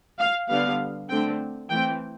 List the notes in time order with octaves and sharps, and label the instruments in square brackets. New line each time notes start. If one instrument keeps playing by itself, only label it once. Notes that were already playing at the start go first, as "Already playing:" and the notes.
[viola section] F5
D3 G3 B3 F5
D3 A3 C4 G5
E3 A3 C4 G5